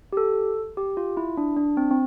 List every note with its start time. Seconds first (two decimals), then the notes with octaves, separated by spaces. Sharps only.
0.13 G4
0.17 A4
0.77 G4
0.97 F4
1.17 E4
1.37 D4
1.57 D4
1.77 C4
1.91 C4